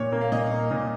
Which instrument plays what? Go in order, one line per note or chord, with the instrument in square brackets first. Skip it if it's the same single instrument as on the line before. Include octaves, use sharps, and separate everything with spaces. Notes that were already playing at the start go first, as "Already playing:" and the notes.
Already playing: [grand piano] A#2 [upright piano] C#5
[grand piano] A#3
[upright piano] F5
[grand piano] A#2 [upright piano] D#5
[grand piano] A#3
A#2